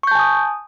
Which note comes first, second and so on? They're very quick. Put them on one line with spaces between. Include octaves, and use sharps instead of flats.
C#6 G6 A5 G#5 D#6